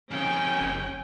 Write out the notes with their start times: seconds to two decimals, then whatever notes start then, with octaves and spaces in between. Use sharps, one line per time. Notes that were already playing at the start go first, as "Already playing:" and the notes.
0.11 F2 C#3 C#4 G5 G#5
0.60 F#1